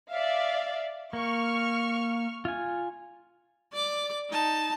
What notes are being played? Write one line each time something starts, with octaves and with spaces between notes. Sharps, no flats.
D5 E5 F5
A#3 C#6 F6
F4 G#5
D5 D6
D#4 A5